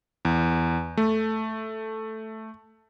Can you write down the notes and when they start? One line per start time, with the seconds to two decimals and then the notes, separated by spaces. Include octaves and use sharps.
0.25 E2
0.97 A3